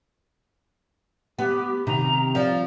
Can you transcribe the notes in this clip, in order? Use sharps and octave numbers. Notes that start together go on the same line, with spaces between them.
B3 G4
C3 D#3 A#5
F3 D5